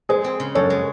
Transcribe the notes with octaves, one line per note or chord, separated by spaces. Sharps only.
G#3 G#4 C5
C4
C#3
F#2 A4 C#5
G#3